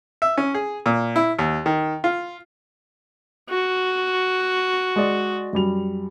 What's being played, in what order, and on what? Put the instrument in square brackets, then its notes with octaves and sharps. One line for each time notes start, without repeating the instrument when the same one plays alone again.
[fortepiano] E5
C#4
G#4
A#2
E4
D#2
D#3
F4
[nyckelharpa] F#4
[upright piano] G#3 D5
F#2 G3 F7